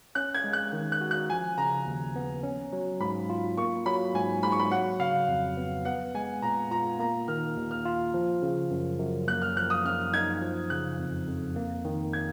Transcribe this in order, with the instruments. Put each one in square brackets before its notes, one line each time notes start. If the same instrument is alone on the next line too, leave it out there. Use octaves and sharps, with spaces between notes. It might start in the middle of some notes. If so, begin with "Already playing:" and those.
[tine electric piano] C#4 [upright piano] F#6
[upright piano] G#6
[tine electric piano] G#3
[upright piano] F#6
[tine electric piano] D#3
[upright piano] F#6
[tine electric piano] F#4
[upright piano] F#6
[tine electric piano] F3 [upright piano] G#5
[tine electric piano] C#3 [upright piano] A#5
[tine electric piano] D#2
B3
C#4
F#3
[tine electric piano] G#2 [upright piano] B5
[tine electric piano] F4
[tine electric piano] A#3 [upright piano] C#6
[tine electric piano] F#3 [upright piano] B5
[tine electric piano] G#2 [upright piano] G#5
[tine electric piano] G#2 [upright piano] B5
[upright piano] C#6
B5
[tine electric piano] F#3 [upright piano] F#5
[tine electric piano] C#3 [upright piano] F5
[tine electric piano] F2
B3
[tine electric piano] B3 [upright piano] F#5
[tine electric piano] G#3 [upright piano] G#5
[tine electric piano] A#2 [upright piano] A#5
[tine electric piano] F4 [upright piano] A#5
[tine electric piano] A#3 [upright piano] A#5
[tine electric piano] D#3 [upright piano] F6
[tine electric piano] D#2
[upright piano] F6
[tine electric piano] F4
F3
C#3
F#2
F#2
[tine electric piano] A#3 [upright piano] F#6
[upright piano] F6
[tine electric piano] F3 [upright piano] F#6
[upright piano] D#6
[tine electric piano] F#2 [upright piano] F6
[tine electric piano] D#4 [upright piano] G#6
[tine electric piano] F3
[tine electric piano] C#3 [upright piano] F#6
[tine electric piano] F2
F2
A#3
D#3
[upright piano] G#6